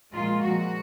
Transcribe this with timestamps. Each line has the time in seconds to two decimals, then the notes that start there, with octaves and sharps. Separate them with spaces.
0.13 A#2 F3 G#3 F4
0.43 A#2 F3 G#3 F#4